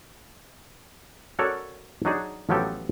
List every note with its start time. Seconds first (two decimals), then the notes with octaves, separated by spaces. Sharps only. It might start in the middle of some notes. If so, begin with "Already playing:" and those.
1.39 C#4 F#4 A4 A#4 C#5 D5
2.05 F#3 D4 D#4 F#4 G#4
2.49 A1 F3 F#3 B3 G4 A4